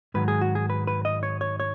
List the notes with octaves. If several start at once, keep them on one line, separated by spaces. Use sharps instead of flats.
G#2 D#3 F#3 B4
G#4
F#4
G#4
B4
B4
D#5
C#5
C#5
C#5